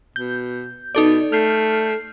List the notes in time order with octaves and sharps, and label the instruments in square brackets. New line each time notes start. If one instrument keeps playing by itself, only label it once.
[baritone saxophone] B2 [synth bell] G6
[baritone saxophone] B2 [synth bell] D#4 A4 D5
[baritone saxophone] A3 [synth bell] F6 G6 C7